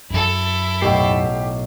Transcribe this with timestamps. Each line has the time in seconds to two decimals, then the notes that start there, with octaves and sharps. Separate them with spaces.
0.10 F#2 F#3 E4 A4
0.81 B1 A2 G4 C7